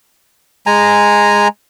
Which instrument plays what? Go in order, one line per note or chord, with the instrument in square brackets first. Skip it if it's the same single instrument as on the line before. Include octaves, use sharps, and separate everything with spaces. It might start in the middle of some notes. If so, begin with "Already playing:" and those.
[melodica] G#3 G#5 A#5